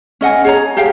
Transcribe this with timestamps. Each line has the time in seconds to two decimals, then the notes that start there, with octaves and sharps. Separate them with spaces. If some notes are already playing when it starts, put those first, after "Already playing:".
0.21 C#4 D#5 F#5 G#5
0.45 G#4 C#5 A#5
0.77 G4 G#4 F5 G5